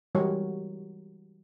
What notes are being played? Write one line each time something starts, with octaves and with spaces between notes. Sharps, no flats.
E3 G3 G#3 F#4 A#4 C#5